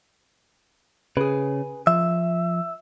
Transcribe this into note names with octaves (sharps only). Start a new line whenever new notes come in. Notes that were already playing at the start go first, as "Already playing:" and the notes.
C#3 G#4 B4
F3 E5